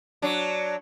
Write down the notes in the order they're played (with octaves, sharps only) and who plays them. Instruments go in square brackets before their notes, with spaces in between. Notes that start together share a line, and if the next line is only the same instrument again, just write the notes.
[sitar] F#3 D4